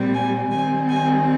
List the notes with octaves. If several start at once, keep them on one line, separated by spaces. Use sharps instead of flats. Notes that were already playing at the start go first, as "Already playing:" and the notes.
Already playing: A#2 G3 C4
G#5
D#3 G3 C4 G#5
G#5